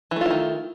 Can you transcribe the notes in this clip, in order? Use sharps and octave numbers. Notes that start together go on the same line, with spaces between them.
D#3 E3 A3 E4 F4